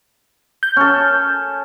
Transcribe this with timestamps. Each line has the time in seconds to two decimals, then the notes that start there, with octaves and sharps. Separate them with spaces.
0.63 G6
0.76 C#4 A4